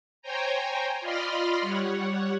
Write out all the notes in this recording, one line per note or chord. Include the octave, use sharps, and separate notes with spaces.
C5 C#5 G5 G#5 A#5
F4 D5 D#5 B5 C6 F6
G3 C#5 F#5